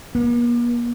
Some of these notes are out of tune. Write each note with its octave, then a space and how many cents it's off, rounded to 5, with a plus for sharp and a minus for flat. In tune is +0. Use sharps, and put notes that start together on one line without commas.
A#3 +45